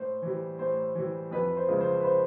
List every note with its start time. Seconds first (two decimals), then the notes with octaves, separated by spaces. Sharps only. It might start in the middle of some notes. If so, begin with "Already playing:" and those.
Already playing: A2 C5
0.22 E3 G3
0.59 A2 C5
0.95 E3 G3
1.31 F2 B4
1.57 C5
1.68 C#3 F3 G#3
1.81 C5
2.00 B4
2.05 C5